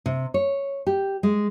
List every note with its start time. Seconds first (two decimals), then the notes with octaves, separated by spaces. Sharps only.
0.06 C3
0.34 C#5
0.87 G4
1.23 G#3